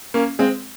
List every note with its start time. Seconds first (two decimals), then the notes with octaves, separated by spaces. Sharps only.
0.14 A#3 C#4
0.39 G#3 C4